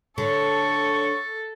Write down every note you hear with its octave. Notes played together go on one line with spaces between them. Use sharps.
D3 A4 C#5 C#6